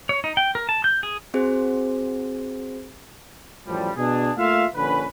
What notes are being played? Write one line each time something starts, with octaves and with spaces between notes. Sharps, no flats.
C#5
D#4
G5
A#4
A5
G6
G#4
C4 F#4 G#4 C5
A1 F#2 F3 G3
B2 D4 G#4
A3 A#3 F4 E5 F5
A#1 D3 C#4 B4